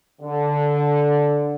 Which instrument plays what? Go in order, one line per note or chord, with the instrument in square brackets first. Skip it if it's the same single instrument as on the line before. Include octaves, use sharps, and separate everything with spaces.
[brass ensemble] D3